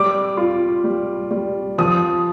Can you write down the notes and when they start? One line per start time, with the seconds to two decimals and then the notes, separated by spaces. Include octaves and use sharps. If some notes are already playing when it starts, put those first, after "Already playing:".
Already playing: G3 D6
0.37 F4
0.84 G3
1.31 G3
1.78 F3 D#6